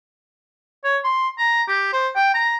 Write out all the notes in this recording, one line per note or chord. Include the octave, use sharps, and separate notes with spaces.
C#5
C6
A#5
G4
C5
G5
A#5